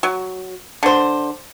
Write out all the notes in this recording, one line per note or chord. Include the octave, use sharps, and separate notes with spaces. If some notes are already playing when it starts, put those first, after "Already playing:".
F#3
D3 C5